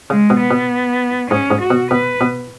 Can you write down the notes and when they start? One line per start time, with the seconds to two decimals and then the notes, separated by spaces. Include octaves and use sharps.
0.10 C#3 G#3
0.30 B2
0.40 B3
0.51 B2
1.31 G#2 C#4
1.51 G#2
1.61 F#4
1.70 B2
1.90 B2 B4
2.21 B2